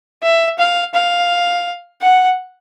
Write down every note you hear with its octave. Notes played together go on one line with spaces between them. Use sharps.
E5
F5
F5
F#5